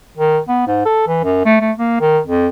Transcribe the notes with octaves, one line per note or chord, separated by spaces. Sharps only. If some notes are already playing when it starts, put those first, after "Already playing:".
D#3
B3
G#2
A4
E3
F#2
A3
A3
A#3
D#3
F2